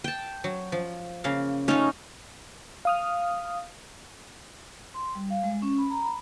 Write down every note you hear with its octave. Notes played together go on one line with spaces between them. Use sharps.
G5 A5
F#3
F3
C#3 A#3 F5
A3 C#4 D#4 F4
F5 D#6 F6
C6
G3
F5
G#3
C#4
B5
A#5
B5